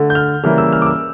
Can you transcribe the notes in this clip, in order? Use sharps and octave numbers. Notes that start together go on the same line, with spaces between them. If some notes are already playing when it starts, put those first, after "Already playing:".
Already playing: D3 A3
G6
F6
C#3 E3 G3 A#3 F6
E6
F6
D6
E6